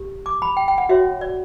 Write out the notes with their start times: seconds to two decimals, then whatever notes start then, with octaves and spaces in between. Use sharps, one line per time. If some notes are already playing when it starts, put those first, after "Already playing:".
Already playing: G4
0.26 D6
0.42 B5
0.57 G5
0.68 G5
0.78 F#5
0.89 F#4 C#5 E5
1.21 D5